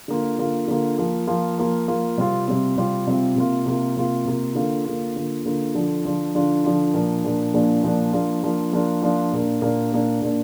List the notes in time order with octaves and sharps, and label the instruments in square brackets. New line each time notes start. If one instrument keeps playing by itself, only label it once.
[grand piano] D3 A#3 F4
D3 A#3 F4
D3 A#3 F4
F3 A#3 F4
F3 A#3 F4
F3 A#3 F4
F3 A#3 F4
C3 G3 C4 F4
C3 G3 C4 F4
C3 G3 C4 F4
C3 G3 C4 F4
C3 A#3 F4
C3 A#3 F4
C3 A#3 F4
C3 A#3 F4
D3 A#3 F4
D3 A#3 F4
D3 A#3 F4
D3 A#3 F4
D3 F3 D4 F4
D3 F3 D4 F4
D3 F3 D4 F4
D3 F3 D4 F4
A#2 F3 A#3 D4
A#2 F3 A#3 D4
A#2 F3 A#3 D4
A#2 F3 A#3 D4
F3 A#3 D4 F4
F3 A#3 D4 F4
F3 A#3 D4 F4
F3 A#3 D4 F4
A#2 A#3 D4
A#2 A#3 D4
A#2 A#3 D4
A#2 A#3 D4